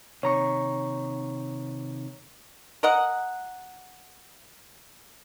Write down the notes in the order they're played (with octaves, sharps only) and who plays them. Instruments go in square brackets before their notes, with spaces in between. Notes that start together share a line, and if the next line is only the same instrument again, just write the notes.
[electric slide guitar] C3 D#3 [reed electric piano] C#5 A#5 C#6
[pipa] A#4 D#5 F#5